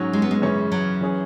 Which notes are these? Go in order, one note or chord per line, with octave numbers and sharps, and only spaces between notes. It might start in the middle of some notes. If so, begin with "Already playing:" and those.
Already playing: G#2 F#3 C#4
G#3
B3
G#3
F#2 C#3 E3 C#4
F#3
E3 C#4 G#4